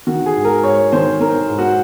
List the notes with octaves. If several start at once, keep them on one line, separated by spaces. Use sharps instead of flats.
D#3 F#4
G#4
G#2
A#4
G#2 C#5
D#3 C5
D#3 A#4
G#2
F#4